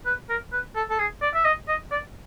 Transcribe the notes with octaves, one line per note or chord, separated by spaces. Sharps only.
B4
A#4
B4
A4
A4
G#4
D5
E5
D#5
D#5
D5